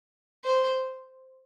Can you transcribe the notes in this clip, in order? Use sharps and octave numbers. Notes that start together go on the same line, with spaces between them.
C5